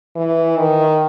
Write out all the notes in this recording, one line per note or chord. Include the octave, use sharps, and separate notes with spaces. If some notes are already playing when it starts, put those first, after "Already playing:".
E3
D#3